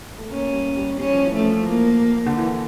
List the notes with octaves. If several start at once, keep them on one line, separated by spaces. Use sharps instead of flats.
A3
A#3 C#4
G3
G3
G3 C#4
F3
E3
A3
F3
A#3
D3
E3